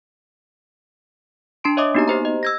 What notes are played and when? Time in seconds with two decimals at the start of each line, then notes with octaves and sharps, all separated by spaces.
1.64 D4 A5 C6 D7
1.77 C#5 D#5 E5 D6 D#6
1.95 A#3 B3 D#4 F#4 G4 A#5
2.08 G4 C5 A#5
2.25 D#5
2.43 E6 G#6 A#6